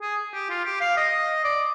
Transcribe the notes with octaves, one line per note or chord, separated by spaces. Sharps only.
G#4
G4
F4
G4
F5
D#5
D5